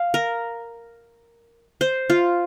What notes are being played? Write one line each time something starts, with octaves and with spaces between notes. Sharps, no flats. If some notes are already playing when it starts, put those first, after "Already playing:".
Already playing: F5
A#4
C5
F4